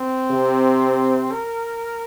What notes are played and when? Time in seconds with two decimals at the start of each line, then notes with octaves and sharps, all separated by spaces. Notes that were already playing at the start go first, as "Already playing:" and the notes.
Already playing: C4
0.31 C3
1.32 A#4